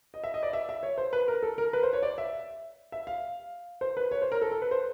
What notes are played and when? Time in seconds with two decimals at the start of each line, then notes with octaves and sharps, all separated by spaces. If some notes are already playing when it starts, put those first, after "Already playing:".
0.14 D#5
0.24 E5
0.34 D#5
0.43 D5
0.53 E5
0.69 E5
0.83 C#5
0.98 C5
1.13 B4
1.28 A#4
1.43 A4
1.58 A#4
1.73 B4
1.83 C5
1.93 C#5
2.03 D5
2.18 E5
2.92 E5
3.07 F5
3.81 C5
3.97 B4
4.11 C#5
4.22 C5
4.32 A#4
4.41 A4
4.52 A4
4.62 B4
4.71 C5